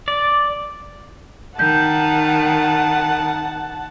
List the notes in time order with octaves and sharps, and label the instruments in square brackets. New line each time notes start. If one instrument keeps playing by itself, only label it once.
[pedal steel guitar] D5
[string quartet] D#3 [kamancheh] F#5 A5 [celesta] G6